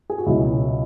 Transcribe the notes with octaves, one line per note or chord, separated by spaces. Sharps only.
G#4
F#4
C#2 B2 F#3 E4